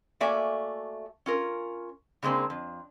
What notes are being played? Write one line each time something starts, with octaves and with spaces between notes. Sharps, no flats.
A3 A#3 F#4 D5 E5 G#5
C#4 F4 A#4
C#3 G#3 A#3 C4 D4
F2